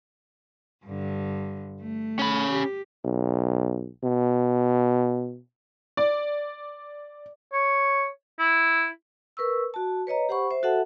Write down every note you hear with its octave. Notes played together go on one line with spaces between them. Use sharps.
G2 D3
A3
C#4 B5
G4
B1
B2
D5
C#5
E4
A#4 B4 C#6 E6
F#4 A5
B4 C#5 D#5 A#5
G4 C5 F#5 B5 C#6
C5 E5
F#4 A4 E5 F#5 A5